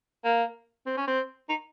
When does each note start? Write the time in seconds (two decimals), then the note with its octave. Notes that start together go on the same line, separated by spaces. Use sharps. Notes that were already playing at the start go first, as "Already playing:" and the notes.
0.24 A#3
0.86 C4
0.97 C#4
1.08 C4
1.49 D#4